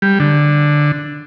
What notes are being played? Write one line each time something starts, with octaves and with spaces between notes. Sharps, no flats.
G3
D3